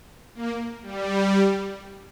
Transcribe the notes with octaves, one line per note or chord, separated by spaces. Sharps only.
A#3
G3